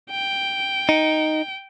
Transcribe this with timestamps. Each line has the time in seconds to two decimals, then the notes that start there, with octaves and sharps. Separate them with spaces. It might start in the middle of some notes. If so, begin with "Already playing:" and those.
0.11 G5
0.89 D#4